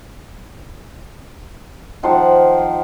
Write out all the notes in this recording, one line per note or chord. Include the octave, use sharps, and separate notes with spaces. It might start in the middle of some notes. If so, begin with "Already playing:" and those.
D#3 F3 C5 F#5